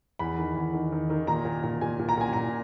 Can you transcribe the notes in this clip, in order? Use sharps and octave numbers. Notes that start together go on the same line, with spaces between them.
E2 B5
D#3
E2
D#3
D#3
D#3
A#2 A#5
A#2
A#2
A#2 G#5
A#2
A#5
A#2 G#5
A#2 A#5